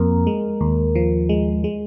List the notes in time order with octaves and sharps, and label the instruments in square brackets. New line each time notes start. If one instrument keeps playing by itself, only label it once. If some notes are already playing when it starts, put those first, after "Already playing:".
Already playing: [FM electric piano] F2 A#3 A#4
G#3
D#2
F3
G#3
G#3